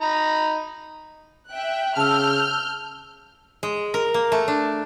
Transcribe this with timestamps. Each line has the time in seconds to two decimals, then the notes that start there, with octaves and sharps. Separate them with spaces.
0.01 D#4 A#5 B5
1.51 E5 G5 F#6
1.97 C#3 A5 E6 F6 G6
3.63 G#3
3.94 A#4
4.14 A#3
4.32 A3
4.48 D4